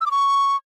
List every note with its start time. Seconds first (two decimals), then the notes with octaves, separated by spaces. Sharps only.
0.01 E6
0.06 D6
0.11 C#6